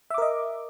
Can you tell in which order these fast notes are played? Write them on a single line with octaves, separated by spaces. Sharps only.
E5 D6 A#4 D#5